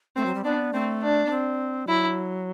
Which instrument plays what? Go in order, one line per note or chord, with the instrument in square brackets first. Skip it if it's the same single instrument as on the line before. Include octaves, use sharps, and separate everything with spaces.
[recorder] A3 [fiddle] C4
[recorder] F#3
G3
[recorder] B3 [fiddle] D4
[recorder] A3 [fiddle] C4
[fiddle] D4
[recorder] B3
C4
[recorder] F#3 [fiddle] E4